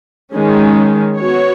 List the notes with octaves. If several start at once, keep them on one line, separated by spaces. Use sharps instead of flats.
D#3 G#3 C#4
B3 F#4 C#5